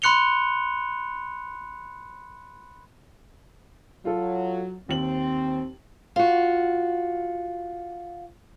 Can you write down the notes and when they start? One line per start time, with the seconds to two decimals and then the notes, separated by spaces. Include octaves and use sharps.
0.02 B5 C6 F#6 C#7 F7 G7
4.05 F#3 F4 A4
4.89 D#2 C4 F#7
6.16 F4 F#4